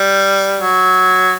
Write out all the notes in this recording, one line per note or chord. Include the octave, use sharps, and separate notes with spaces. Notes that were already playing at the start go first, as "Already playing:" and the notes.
Already playing: G3
F#3